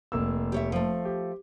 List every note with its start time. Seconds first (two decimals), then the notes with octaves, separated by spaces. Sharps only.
0.12 F1 A#3 E6
0.52 G4 C#5 E5
0.72 F3 A3
1.05 G4